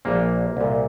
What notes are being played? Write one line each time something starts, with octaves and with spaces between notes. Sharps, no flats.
A#1 A#2 A#3
C2 A#2